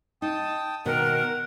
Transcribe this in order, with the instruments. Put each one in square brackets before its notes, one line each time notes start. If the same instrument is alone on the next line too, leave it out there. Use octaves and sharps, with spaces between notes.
[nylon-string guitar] D#4 [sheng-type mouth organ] G5 A5 D#6
[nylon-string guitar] B2 D#3 [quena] A#4 [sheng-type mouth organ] F#5